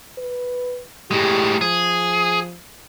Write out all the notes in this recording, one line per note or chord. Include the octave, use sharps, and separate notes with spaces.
B4
A2 G#3 G4
F3 G#4